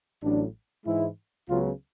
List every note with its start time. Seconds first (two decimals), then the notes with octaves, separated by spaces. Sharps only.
0.23 A1 A2 F#3 D4
0.86 G#2 E3 G#3 E4
1.48 C#2 C#3 F#3 B3 F4